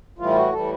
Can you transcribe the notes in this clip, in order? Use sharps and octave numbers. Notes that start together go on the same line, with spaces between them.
A2 E3 G3 F4
F#4
A2 E3 G3 A4